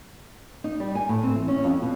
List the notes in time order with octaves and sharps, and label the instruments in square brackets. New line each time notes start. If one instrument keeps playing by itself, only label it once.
[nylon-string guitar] D#4
G3
G#5
A2
C4
E3
C#4
F2
B2